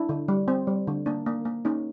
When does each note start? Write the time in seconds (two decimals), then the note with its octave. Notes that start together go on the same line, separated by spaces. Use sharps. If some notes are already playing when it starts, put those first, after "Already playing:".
Already playing: D4 E4
0.09 D3
0.28 G3
0.48 C4
0.67 G3
0.87 D3
1.06 A#3 D4
1.26 A#3
1.45 A#3
1.65 A#3 C#4 D#4